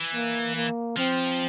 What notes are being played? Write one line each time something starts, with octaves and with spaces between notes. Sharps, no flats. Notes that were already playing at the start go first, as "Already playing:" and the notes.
Already playing: E3
A#3
A#3
F3 C4